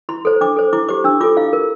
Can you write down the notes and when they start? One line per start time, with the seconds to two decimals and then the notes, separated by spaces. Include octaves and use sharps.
0.09 E4 C6
0.25 A4 C5
0.41 D4 D6
0.57 A4 C5
0.73 E4 D6
0.88 G4 C5 D6
1.04 D4 E6
1.21 F4 D6
1.24 A4
1.36 E4 F5
1.53 A#4